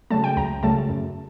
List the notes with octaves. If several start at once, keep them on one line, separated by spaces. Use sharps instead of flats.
C#3 F#3 A3 A5
G5
C#2 A#5
C#3 F#3 A3 A5
F#2